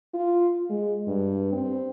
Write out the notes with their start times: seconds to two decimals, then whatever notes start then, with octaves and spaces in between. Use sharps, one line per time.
0.14 F4
0.70 G#3
1.07 G2
1.53 C4